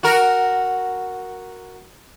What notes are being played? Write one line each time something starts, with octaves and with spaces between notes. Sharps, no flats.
F#4 A#4